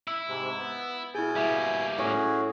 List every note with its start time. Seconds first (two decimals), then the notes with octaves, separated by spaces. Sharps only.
0.08 E4 E6
0.27 G#2 C3 G#3
0.58 B3
1.15 B2 E4 G#4 G#5 G6
1.36 G3 A#3 E5
1.98 A2 C#4 F#4 G#4